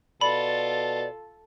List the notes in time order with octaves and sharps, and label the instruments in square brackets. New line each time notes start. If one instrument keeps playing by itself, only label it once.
[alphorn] B2 [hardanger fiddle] F4 A4 [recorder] D5 [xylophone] B5